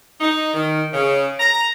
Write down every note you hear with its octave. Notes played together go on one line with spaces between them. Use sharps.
D#4
D#3
C#3
A#5